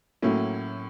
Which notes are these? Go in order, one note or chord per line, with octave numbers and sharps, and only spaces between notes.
A2 F#3 A#3 C#4 E4